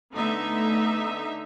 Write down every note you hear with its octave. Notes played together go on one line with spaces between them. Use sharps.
D3 A3 B3 D#4 E5